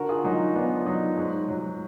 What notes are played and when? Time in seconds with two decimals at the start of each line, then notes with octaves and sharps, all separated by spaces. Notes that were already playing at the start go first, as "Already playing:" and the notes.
Already playing: D3 F#4 A#4
0.09 F4 G#4
0.24 F#3 D#4 F#4
0.55 B3 D4 F4
0.86 F#3 D#4
1.17 G#2
1.48 F#3